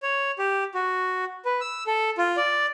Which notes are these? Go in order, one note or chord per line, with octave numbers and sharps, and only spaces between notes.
C#5
G4
F#4
B4
E6
A4
F4
D5